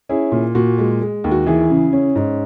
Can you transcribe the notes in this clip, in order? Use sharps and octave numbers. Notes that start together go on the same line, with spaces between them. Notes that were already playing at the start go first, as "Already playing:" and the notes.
C#4 E4 G#4
A#2
A#2 F#4
G#3
G#3
D#2
F#4
E3 E4 G#4
C#3
C#4
G#2